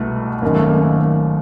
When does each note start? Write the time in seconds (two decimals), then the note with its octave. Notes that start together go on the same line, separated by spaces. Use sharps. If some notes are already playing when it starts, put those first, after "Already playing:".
Already playing: C2 B2 A3
0.42 G#1 F#2 D#3 A#3
0.55 A3
0.69 A#3